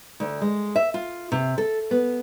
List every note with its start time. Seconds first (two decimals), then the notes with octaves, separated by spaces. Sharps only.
0.20 D2
0.41 G#3
0.76 E5
0.94 F4
1.32 C3
1.58 A4
1.91 B3